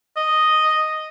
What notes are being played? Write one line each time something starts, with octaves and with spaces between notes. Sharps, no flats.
D#5